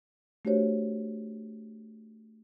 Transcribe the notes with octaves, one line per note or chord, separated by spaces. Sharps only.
A3 D4 F#4 G4 C5 C#5